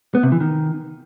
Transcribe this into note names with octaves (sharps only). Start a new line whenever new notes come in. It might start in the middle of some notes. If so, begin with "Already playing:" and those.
B3
C3
E3
D#3